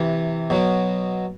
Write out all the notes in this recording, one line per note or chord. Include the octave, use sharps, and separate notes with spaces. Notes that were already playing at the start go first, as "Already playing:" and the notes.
Already playing: C3 E3
B2 F#3